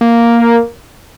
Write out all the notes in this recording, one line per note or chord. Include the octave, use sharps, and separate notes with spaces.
A#3